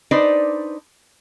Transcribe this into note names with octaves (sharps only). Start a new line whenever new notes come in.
D4 D#4 B4 C5 D5